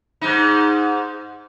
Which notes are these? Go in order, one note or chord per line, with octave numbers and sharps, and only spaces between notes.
G#2 D#4